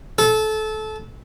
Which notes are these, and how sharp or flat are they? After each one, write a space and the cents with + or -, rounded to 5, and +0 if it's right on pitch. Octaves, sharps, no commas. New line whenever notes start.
A4 -25